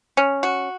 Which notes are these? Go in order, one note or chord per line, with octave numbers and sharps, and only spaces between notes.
C#4
F#4